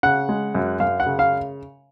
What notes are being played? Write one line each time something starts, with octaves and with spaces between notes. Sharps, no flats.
C#3 F#5
G#3
F#2
F#2 F5
F#5
C#3
F5